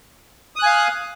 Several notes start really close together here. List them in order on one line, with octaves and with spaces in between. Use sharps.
D#6 F#6 G#5 F5